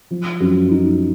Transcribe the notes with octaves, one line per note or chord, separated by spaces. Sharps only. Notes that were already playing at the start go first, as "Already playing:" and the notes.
F3
F#2
D#4